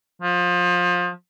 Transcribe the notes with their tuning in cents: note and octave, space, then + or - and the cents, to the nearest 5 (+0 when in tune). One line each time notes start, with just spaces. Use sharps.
F3 +25